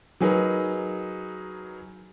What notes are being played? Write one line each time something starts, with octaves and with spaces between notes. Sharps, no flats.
F#3 D#4 G#4 A#4 B4